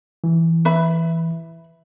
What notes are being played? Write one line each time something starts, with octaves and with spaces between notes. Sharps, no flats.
E3
B4 E5 B5